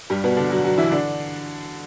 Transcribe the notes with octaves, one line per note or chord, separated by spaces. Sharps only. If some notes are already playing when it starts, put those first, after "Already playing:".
G2 G3
B2 B3
D3 D4
F#3 F#4
F#3 F#4
E3 E4
D3 D4